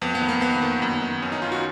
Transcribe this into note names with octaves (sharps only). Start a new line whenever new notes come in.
F2 B3
B3
D#3
A#3
F2 B3
D#3
F#2
D#3
F#2 C#4
D#4
D#3 F4
F#4